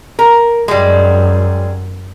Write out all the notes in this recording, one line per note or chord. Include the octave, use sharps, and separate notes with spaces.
A#4
F#2 G3 G#3